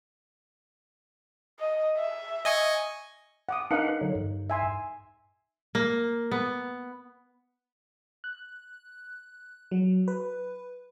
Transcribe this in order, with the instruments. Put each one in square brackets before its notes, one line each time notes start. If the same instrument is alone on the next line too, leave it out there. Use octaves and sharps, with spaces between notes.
[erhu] D#5
E5
[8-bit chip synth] D#5 G#5 C#6
[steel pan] F#5 D6 D#6
[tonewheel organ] D4 B4 F#5 [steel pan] D#4 A#4 F5
[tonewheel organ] D3 F#3
G2
[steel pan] E5 G#5 C6
[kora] A#3
B3
[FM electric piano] F#6
F#3
B4